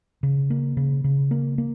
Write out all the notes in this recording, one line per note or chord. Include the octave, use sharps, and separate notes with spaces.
C#3
A#3
C#3
C#3
A#3
A#3